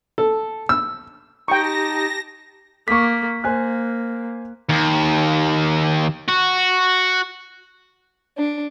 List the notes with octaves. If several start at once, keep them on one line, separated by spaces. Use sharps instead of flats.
A4
E6
D#4 G4 G5 A5 C#6 A#6
A#3 C#6 D6 B6
A#3 C5 G#5 F#6
D#2
F#4
D4